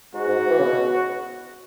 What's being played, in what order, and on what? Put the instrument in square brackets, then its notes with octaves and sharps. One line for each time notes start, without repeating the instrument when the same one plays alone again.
[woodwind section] G#2 [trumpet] F#4
[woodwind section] G#2
G#2
E3
C#3
B2